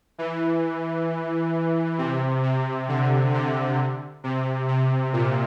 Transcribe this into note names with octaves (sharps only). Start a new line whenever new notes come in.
E3
C3
C3
D3
C3
C3
C3
A#2